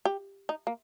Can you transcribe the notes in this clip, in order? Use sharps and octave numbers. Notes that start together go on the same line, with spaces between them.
G4
D#4
A#3